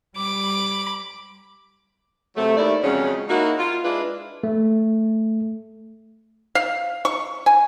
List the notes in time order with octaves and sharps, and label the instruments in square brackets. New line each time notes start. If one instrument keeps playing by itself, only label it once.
[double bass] G3 [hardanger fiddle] B5 D6
[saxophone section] C3 F#3 A3
D#2 A3 E4 D5
F2 C#3 F#3 G#3 C#4
A#3 D#4 E4 F#4
F4
G#3 D4 E4 F4 B4
[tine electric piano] A3
[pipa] F5
C#6
G#5